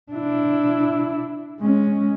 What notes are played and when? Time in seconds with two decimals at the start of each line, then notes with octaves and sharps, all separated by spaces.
0.12 D4 E4
1.61 G#3 C#4